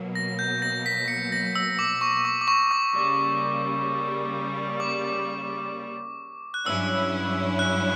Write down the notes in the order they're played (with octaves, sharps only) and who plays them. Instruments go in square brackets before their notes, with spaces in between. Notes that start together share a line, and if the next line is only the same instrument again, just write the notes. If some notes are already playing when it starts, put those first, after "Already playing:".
Already playing: [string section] B2 F#3 A#3
[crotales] A#6
G6
A#6
B6
C#7
A#6
E6
D6
C#6
C#6
D6
D6
C#6
D6
[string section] C#3 G3 A#3
[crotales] D6
F#6
[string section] G2 F#3 C#4 E4 [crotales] E6
[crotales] F#6